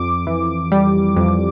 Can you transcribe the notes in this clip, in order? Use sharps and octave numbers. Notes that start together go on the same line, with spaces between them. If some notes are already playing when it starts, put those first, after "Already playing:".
Already playing: F2 D6
E3
G3
F2